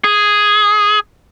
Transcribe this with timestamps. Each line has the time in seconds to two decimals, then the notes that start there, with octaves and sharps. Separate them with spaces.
0.04 G#4